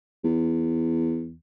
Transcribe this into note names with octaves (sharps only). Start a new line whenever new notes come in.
E2